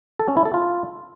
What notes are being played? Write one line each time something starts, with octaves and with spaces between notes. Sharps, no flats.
A4
C#4
E4
A4
F4